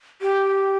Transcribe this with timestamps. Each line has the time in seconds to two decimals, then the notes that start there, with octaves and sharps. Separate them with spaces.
0.21 G4